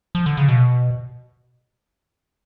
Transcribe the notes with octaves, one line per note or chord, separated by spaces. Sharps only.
F3
D3
C#3
B2